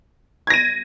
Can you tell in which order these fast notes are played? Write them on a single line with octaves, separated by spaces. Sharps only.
G#6 A#6 D#7